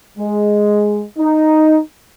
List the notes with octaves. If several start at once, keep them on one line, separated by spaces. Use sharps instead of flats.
G#3
D#4